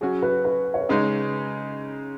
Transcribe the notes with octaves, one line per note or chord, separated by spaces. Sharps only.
F#3 C#4 F#4 G#4
B4
B4
C#5
B4
C#3 G#3 D#4 C#5